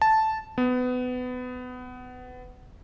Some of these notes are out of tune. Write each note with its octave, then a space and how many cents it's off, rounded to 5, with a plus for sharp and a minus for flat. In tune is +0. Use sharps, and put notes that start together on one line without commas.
A5 -5
B3 +25